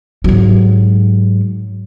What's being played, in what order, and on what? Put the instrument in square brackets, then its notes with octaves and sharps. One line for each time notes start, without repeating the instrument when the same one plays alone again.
[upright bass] G#2 F#3